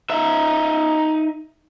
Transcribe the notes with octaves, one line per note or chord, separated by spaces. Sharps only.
D#4 E5